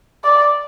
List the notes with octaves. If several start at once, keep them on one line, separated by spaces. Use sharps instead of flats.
D5